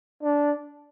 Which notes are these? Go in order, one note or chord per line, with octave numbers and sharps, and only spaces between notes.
D4